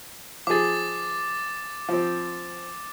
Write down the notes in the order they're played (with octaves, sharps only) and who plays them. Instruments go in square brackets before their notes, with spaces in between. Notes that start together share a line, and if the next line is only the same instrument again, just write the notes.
[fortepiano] F3 G#4 [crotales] D6 A6
[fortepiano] F3 C4